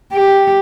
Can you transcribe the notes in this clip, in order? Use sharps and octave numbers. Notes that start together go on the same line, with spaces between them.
G4